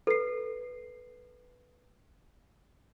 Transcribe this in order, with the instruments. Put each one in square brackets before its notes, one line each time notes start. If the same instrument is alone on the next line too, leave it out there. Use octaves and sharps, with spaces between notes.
[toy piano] A4 [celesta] B4 C7